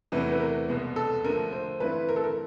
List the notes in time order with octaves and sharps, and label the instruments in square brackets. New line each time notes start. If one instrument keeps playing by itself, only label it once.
[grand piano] E2 C3 E3 A3 [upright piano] B4
[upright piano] B4
A#4
[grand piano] C2 B2 G#3 B3
[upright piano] A4
[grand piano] D3 F3 A3 [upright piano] A#4
[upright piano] C5
[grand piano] G2 E3 A3 C4 E4 [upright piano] B4
[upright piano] A#4
A4
A#4